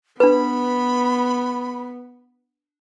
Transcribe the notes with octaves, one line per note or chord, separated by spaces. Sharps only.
B3 D4 B4 B5